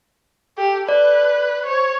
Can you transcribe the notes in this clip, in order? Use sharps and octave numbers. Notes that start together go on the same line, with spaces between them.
G4 A4
B4 D5
C5 C#5